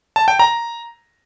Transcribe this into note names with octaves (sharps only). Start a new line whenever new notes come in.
A5
G5
A#5